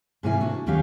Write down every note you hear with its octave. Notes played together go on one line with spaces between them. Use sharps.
G#2 C3 A#3 E4 G#5
D4 F#4
D#2 F#3 B3 C#4 G4 F5